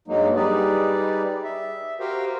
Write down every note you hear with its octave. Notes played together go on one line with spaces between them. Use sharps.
G2 F#3 G#3 A#3 D#4
G3 D#4 G4 G#4 B4 D5
E5
F#4 G4 A#4 C5 F5 G5